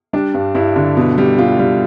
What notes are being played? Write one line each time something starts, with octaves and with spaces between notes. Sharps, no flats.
G3 D4
G2
G2 E4
D3
B2
G3
B2 F4
G3